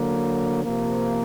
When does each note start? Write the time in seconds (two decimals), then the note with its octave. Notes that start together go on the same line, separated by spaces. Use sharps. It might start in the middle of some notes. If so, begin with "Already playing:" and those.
Already playing: D3 F#3 A#3
0.64 C3 F3 A#3